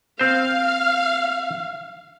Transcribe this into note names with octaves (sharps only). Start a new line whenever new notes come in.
C4 C5 F5